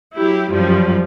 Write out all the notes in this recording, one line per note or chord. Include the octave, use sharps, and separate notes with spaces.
F#3 E4 G4
F#2 F3 G3